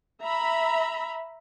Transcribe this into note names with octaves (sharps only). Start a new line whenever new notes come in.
E5 A#5 B5